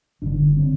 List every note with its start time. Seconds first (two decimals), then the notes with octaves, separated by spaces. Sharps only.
0.22 G1 G2 D3 D4
0.57 D3 C4